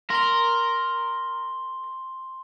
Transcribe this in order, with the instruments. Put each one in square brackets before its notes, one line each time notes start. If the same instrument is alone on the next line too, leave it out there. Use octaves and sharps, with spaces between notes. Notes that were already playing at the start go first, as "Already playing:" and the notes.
[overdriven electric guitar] A#4 [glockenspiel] C6 G7